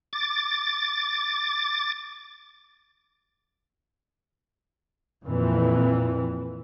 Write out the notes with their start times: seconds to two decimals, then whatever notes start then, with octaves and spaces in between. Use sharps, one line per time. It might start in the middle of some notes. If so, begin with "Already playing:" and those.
0.13 D6 A6
5.25 F2 A#2 E3